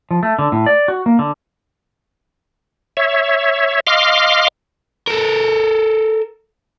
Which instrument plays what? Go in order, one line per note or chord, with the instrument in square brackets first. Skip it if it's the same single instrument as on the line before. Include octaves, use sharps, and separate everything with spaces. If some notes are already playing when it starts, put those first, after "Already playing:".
[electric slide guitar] F3
A3
D3
A2
D5
F#4
A#3
D3
[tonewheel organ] C#5 E5
D#5 F5 C6 D6 F6
[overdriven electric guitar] A4 A#4